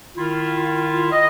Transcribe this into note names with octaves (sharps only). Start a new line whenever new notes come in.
D#3 E4 F4
D#5